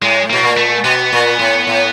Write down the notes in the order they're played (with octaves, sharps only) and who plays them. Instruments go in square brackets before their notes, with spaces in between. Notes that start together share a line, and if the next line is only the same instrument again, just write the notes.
[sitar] A2 [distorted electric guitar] G#3
[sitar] B2 [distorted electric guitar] A#3
[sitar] A#2
[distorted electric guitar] A3
[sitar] B2 [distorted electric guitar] B3
[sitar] A#2
A2
A2